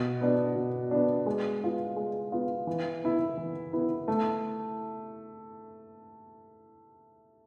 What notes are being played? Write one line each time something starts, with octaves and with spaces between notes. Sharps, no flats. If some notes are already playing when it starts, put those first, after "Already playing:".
Already playing: B2
B3 D4
B2
B3 D4
G#3
B3 F4
G#3
B3 F4
E3
B3 E4
E3
B3 E4
A3